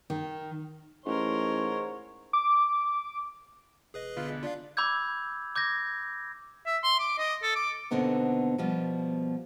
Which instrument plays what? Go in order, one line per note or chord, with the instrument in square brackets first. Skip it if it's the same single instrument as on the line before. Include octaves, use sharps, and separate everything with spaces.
[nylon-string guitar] D#3
[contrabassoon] A1 [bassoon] G#2 [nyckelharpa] A#4 C6 [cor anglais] C#5
[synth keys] D6
[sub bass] E1 [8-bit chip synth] G#4 B4 D#5
[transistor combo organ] D3 B3 [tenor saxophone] F4
[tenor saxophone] G#3
[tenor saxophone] D4 [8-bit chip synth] F4 F5
[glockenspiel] B5 D6 E6 G6 G#6
D6 G6 G#6 A#6
[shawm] E5
C6
D6
D#5
A4
D6
[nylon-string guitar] D#2 B2 D3 B3 C4 D#4
B2 F3 G3 B3